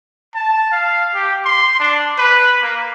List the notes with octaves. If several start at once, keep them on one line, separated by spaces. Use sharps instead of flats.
A5
F5
G4
C6
D4
B4
A#3